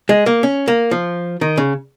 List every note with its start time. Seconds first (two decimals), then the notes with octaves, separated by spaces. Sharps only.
0.09 G#3
0.26 A#3
0.43 C#4
0.68 A#3
0.91 F3
1.41 D#3
1.57 C#3